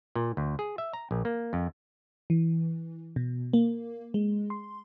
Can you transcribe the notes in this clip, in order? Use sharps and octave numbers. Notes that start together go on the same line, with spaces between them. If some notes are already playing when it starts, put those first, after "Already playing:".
A#2
D2
G#4
E5
A#5
A#1
A#3
F2
E3
B2
A#3
G#3
C6